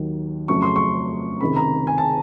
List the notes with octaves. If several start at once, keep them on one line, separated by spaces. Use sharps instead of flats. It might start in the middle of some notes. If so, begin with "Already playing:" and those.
Already playing: D#2 D#3 F#3
F2 C#3 F#3 A3 C#4 C#6
C6
C#6
C#2 C3 D#3 B5
A#5
G#5
A5